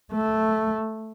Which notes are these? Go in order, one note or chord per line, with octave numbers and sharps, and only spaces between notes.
A3